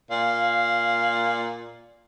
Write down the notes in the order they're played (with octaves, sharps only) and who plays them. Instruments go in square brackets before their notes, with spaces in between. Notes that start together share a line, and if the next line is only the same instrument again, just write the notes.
[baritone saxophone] A#2 [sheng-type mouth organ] F5